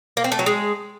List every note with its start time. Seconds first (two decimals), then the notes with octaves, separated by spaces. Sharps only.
0.17 A#3
0.24 C4
0.32 A3
0.39 F#3
0.46 G#3